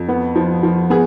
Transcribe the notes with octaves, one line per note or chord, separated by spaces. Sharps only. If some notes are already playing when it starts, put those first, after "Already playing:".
Already playing: F2
B3
F3
F3
B3 G#4